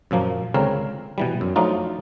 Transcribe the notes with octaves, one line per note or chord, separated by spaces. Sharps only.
F#2 A#2 F3 A#3
C#2 D3 C4 A#4 C#5 F5
B2 E3 G3
F#2
F3 F#3 A3 D4 D#4 F4